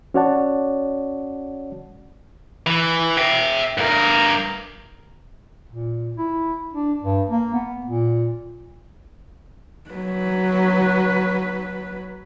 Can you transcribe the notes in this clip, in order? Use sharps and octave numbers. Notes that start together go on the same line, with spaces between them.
C#4 F#4 C#5 D5 F#5 A5
E3
E5 G5
G2 A#4
A#2
E4
D4
G2
A#3
B3
A#2
F#3 B4